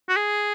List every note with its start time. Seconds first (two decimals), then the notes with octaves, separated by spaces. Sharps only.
0.09 F#4
0.16 G#4